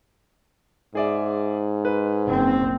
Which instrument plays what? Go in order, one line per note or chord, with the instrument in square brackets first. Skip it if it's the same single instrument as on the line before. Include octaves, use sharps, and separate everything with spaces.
[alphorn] G#2 [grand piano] G#4 D5 E5
[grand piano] B4
[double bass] F#1 C4